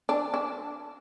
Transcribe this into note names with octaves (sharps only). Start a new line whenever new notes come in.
D4
D4